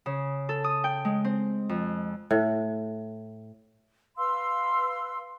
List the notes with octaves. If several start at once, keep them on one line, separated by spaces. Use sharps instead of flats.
C#3
A4
D#6
G5
G#3
C4
F2
A2
B4 F5 C6 E6